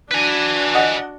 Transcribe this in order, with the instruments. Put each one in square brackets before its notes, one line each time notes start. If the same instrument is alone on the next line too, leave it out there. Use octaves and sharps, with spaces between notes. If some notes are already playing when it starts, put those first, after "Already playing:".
[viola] D4 F#4 [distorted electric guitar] B4 G#5
[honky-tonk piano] D#5 F#5